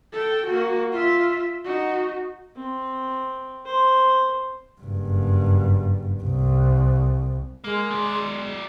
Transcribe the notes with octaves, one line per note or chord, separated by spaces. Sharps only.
A4 G5
A#3 F#4
F4 E5
D#4 F#4
C4
C5
F#1 G2
C2
G#3 A#3
F#3 D5